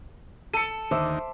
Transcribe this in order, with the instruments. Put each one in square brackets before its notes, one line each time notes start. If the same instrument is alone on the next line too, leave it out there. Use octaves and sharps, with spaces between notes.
[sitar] A4 [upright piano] C#7 D#7
[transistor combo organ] D#2 D3 D#3 [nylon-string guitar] C5 [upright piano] E5 D6 E6